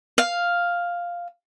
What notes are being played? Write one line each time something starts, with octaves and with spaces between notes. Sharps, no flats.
F5